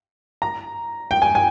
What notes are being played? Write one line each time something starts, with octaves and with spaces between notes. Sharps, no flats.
A#5
G5
G#5
G#5